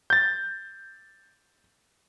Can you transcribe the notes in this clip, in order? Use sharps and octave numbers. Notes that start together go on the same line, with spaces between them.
G6 A6